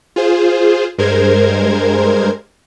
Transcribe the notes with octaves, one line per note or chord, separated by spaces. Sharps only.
F4 G#4 C5
G2 G#3 A#4 C5 G#6